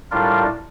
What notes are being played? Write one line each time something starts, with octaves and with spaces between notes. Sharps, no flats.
A2 G3 D4 F4 A#4